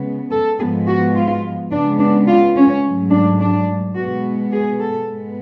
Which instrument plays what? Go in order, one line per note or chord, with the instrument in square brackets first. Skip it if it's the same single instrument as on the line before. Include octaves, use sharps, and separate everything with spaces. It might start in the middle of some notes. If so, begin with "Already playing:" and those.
Already playing: [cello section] C#3 G#3 B3
A4
G#2 F3 G#3 B3 G#4
F#4
F4
C#3 G#3 B3 D4
D4
F4
C#4
G#2 F#3 A3
D4
D4
B2 G#3 B3 F#4
G#4
A4
G#2 G#3 B3